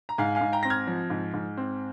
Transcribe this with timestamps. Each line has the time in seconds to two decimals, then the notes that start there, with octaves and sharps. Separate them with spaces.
0.09 A#5
0.18 G#2 F5 G#5
0.35 F5 G#5
0.41 G#2
0.52 G5 A#5
0.63 C4 A#6
0.70 F6 G#6
0.87 F3
1.10 G#2
1.34 G#2
1.57 C4